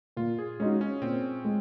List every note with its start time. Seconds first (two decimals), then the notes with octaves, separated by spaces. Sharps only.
0.17 A#2 F4
0.39 G#4
0.60 G#3 C#4 D#4 F#4
0.81 C#4
1.01 A#2 C4
1.44 G#3